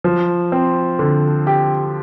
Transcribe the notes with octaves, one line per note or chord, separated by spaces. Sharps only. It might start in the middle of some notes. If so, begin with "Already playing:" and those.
F3
C4
D3
G4